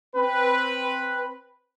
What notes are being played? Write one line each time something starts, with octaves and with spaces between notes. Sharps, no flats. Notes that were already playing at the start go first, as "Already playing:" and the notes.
C4 B4